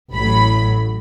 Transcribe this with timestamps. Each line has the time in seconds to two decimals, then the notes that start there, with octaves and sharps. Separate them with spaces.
0.15 A1 A2 F#3 B5